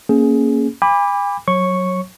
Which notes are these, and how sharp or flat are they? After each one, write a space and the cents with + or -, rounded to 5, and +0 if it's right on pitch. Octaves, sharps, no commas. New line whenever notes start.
A#3 +0 C#4 +0 G#4 +15
G#5 -45 B5 +0 D6 +0
F#3 +0 C#5 -25 C#6 +0